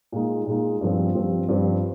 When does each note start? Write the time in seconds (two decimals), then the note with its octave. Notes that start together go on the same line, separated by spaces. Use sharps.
0.12 A#2 G#3 D#4
0.46 A#2 G#3 D#4
0.81 G2 F3 C4
1.15 G2 F3 C4
1.48 G2 F3 C4